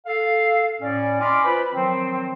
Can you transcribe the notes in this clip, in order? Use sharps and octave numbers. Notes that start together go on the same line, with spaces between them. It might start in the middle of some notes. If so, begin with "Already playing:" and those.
A4 F5
A2 C#4 D5
D#5 G#5 B5 C6 D6 F6
F4 B4 C5 B5
D#3 F3 F#3 C4